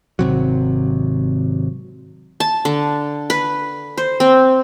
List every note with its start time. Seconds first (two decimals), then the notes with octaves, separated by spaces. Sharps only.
0.19 G#1 C3 F#3
2.40 A5
2.65 D3
3.30 B4
3.97 C5
4.20 C4